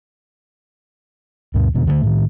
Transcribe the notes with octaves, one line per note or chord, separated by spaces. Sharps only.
D2 G2 B2
E2 B2 D3
D3 D#3 A3
A2 D#3